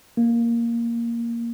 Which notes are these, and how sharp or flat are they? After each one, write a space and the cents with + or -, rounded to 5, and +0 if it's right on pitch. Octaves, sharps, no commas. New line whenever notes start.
A#3 +0